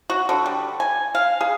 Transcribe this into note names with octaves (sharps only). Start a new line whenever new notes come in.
F#4
D3
G3
G#5
F5
G#4